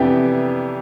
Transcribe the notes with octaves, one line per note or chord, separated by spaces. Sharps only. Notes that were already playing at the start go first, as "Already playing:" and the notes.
Already playing: F2 C3 E3 B3 D4 G4 G5